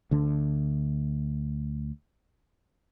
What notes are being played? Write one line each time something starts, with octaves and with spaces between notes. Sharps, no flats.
D2 D3 D4